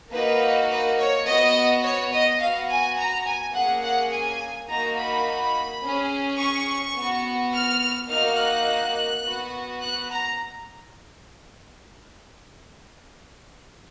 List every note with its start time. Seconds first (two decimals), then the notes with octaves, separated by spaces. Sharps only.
0.12 A#3 D#4 F#4 B4
0.70 B4
0.99 C#5
1.26 B3 F#4 D#5
1.83 C#5
2.12 D#5
2.40 B3 F#4 F5
2.68 G#5
2.97 A#5
3.26 G#5
3.54 A#3 C#4 G#4 F#5
3.82 F#5
4.11 G#5
4.68 A#3 D#4 F#4 A#5
4.97 B5
5.82 C#4 G#4
6.38 C#6
6.95 B3
7.00 F#4
7.53 F6
8.09 A#3 D#4 F#4 F6
8.37 F#6
9.23 B3 F#4
9.81 F#6
10.09 A#5